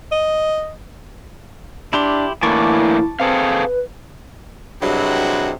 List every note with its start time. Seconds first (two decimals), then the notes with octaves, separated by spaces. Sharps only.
0.12 D#5
1.93 D4 E4 G4 C6
2.43 A2 D3 E3 A#3 E4 A5 C#6 D6
3.20 C4 G#4 A4 B4 F5
4.82 G2 C3 F#3 G#3 E4 F#4